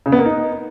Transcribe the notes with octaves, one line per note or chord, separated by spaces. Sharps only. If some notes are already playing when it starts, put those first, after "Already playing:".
C#3
B3
A#3
D#4